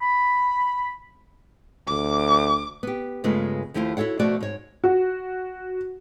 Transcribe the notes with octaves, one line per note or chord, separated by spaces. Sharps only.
B5
D2 D6
B3 G4
G2 C#3 G#3 A3 B3 F4
D#2 F3 A3 E4 F4
E4 F#4 A4 C#5 F#5
B2 F3 A3 F#4 D5
G#2 C#5
F#4